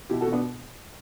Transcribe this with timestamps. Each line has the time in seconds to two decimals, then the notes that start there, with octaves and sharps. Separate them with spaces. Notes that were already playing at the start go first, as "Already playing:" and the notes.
0.09 B2 E4 G4
0.21 F#4 A4
0.27 B2
0.32 B3 D4